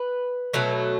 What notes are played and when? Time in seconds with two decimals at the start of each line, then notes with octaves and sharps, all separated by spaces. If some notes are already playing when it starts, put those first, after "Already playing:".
Already playing: B4
0.53 B2 F#3 A3